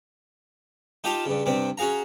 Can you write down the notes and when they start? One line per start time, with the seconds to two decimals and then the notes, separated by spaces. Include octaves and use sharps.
1.04 D#4 F4 G4 F5 A5
1.26 G2 C#3
1.46 G2 C3 C4
1.78 C#4 F#4 G#4 F5 A#5